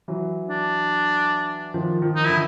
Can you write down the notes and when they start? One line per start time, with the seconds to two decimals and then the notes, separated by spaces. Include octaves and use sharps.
0.08 E3 F#3
0.49 D4
1.74 D#3 F3
2.02 D#3 F3
2.16 D#4
2.27 D3 E3 E4